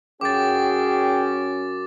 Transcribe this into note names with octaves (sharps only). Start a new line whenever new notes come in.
F#2 C#4 G#4 G5 D6 A6